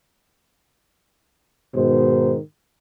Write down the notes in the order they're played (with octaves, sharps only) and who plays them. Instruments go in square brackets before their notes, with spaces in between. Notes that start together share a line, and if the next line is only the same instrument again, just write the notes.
[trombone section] G#2 B2 D#3 C5